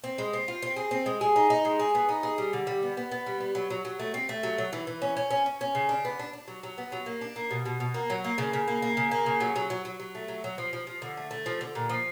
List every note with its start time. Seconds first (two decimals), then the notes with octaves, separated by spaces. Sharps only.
0.04 C4
0.18 G#3
0.33 C4
0.48 F4
0.62 C4
0.76 G#4
0.91 C4
1.06 G#3
1.21 G#4
1.36 D#4
1.50 D#4
1.65 G#3
1.80 G#4
1.95 B3
2.09 D#4
2.23 G#4
2.38 G3
2.53 D3
2.67 G3
2.83 B3
2.97 B3
3.12 B3
3.27 G3
3.41 B3
3.55 F#3
3.70 F#3
3.85 F#3
4.00 A3
4.14 C4
4.29 A3
4.43 F#3
4.58 F#3
4.73 E3
4.87 E3
5.02 C#4
5.17 C#4
5.31 C#4
5.46 C#4
5.61 C#4
5.75 C#3
5.89 D4
6.05 B3
6.19 D4
6.33 D4
6.48 F#3
6.63 F#3
6.78 B3
6.92 F#3
7.06 A#3
7.21 D4
7.36 A#3
7.51 B2
7.66 B2
7.80 B2
7.94 A#3
8.10 F#3
8.24 A#3
8.38 C#3
8.53 C#3
8.68 A#3
8.82 A#3
8.97 C#3
9.11 A#3
9.26 C#3
9.40 F#3
9.56 F#3
9.70 F#3
9.85 F#3
10.00 F#3
10.15 A3
10.28 F#3
10.44 F#3
10.58 F3
10.73 F3
10.87 F3
11.02 D3
11.17 A3
11.31 A3
11.46 F3
11.61 D3
11.75 A#2
11.89 F3